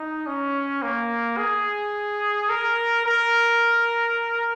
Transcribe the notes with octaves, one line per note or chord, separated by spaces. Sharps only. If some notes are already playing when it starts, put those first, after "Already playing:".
Already playing: D#4
C#4
A#3
G#4
A#4
A#4